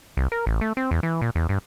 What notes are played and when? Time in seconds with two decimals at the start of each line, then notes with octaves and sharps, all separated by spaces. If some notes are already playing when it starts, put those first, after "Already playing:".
0.17 C2
0.32 A#4
0.47 A1
0.61 A3
0.77 C4
0.91 E2
1.03 E3
1.22 A#2
1.35 E2
1.49 G2